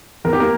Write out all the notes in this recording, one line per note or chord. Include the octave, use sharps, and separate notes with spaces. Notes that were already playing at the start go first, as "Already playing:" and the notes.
E2 A#4
G4
A#3 A#4